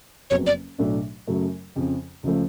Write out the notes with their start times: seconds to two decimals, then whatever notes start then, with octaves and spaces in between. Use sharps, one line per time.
0.30 F#1 F2 C#3 F#3 B3 C#5
0.46 D5
0.78 B1 A2 F#3 A3 D4
1.27 F#2 C#3 F#3 A3
1.76 F2 C#3 F3
2.23 C#2 C#3 F3 A3